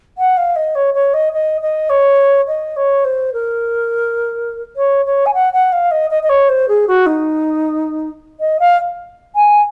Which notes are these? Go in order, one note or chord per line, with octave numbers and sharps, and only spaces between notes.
F#5
F5
D#5
C#5
C#5
D#5
D#5
D#5
C#5
D#5
C#5
C5
A#4
C#5
C#5
G#5
F#5
F#5
F5
D#5
D#5
D#5
C#5
C5
G#4
F#4
D#4
D#5
F5
G#5